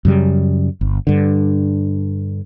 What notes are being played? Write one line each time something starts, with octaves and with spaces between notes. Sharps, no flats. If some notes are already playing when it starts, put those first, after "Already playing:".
F#2 C#3 G3
G1
G2 D3